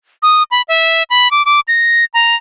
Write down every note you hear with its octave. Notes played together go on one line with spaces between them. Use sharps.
D#6
B5
E5
B5
D6
D6
A#6
A#5